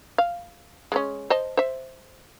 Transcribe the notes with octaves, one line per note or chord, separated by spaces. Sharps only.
F5
G#3 A#3 C#4
C5 D#5 A5
C5 E5